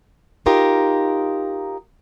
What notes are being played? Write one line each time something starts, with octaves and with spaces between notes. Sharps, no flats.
D#4 F4 G4 A#4 D#5